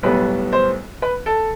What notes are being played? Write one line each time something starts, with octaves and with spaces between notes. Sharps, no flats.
B1 A2 G3 B3 B4
C5
B4
A4